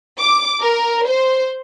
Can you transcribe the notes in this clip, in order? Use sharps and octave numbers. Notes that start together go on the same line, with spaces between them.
D6
A#4
C5